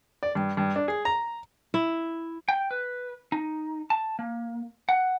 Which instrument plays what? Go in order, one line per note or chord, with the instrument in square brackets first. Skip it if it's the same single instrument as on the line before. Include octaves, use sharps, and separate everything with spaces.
[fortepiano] D5
G2
G2
D4
G#4
A#5
[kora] E4
[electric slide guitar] G5
B4
D#4
A5
A#3
F#5